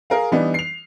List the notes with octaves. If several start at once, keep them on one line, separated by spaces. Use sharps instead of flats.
G#4 A#4 F5
E3 G3 B3 D4 D#4
C7 F7